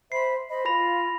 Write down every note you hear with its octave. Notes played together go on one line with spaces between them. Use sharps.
C5 E5 B5 C7
C5 D#5 B5
F4 B5 A#6 F7